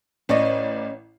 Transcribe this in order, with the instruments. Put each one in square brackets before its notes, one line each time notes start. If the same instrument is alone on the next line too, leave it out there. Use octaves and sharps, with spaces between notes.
[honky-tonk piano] A1 D5 [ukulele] C#4 D#5